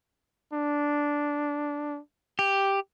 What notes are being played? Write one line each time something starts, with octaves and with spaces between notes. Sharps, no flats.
D4
G4